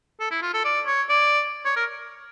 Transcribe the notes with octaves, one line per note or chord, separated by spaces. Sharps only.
A4
E4
F4
A4
D5
C#5
D5
C#5
A#4